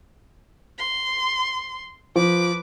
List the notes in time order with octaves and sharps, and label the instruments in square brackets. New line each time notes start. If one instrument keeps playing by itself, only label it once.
[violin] C6
[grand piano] F3 [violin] B4 D6